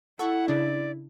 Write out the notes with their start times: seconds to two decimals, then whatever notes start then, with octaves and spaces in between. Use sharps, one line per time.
0.19 E4 A4 F#5 C#6
0.48 C#3 D4 D5